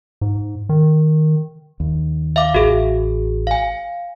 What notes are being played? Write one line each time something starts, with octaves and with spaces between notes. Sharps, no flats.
G#2
D#3
D#2
E5 F5 D6
A1 F#4 G#4
F5 G#5